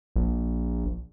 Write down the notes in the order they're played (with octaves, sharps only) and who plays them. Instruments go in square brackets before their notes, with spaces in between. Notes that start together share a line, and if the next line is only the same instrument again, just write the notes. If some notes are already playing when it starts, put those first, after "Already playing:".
[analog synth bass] A#1